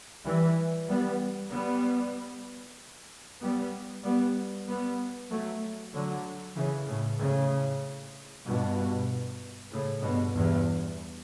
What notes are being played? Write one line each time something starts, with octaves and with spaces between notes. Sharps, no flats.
E3 G3
G3 B3
G3 B3
G3 B3
G3 B3
G3 B3
F#3 A3
D3 F#3
C#3 E3
A2 C#3
A2 C#3
G2 B2
A2 C#3
G2 B2
E2 G2